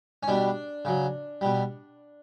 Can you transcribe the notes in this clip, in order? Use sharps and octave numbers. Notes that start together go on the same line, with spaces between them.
C#4
B2 G3 D4
C#3 F#3
B2 G3